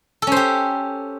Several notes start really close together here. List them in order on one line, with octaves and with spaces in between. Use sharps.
A4 C#4 C5 G4